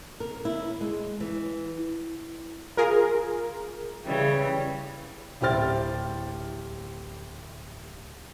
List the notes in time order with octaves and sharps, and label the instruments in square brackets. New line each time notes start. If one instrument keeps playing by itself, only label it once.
[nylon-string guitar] A#4
E4
G#3
E3
[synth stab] F4 G#4 A#4
[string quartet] C#3 E3 G3
[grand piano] D1 E4 G4 C5 F6 A6